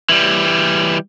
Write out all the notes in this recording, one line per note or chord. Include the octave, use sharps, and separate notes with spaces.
E3 G3